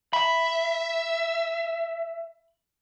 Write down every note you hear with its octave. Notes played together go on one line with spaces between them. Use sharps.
E5 B5